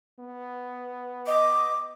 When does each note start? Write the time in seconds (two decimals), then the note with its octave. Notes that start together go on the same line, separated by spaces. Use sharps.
0.19 B3
1.27 D#5 D6